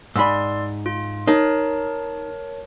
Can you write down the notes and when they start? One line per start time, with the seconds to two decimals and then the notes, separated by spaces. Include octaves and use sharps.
0.16 G#2 D5 B5 C6 E6
0.86 F4
1.27 D#4 A#4 C#5 A5